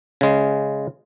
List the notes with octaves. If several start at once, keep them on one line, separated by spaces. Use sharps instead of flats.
C#3 G#3